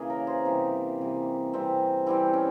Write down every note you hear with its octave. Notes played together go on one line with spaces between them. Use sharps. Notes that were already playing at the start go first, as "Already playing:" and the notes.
Already playing: C#3 E3 A#3 G#4
A#4 C#5
G#4 C5
C3 E3 G3 G4 A#4
C3 E3 G3
E3 G3 C4
E3 G3 C4 E4 G4
C#4